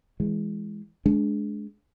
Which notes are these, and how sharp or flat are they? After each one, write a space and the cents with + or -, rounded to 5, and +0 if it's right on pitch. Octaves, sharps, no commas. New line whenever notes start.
E3 +0 G#3 +0
G#3 +25 D4 -15